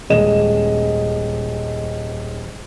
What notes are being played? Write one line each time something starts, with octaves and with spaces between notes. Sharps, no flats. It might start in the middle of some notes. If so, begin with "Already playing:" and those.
D#1 G#3 D#5 E7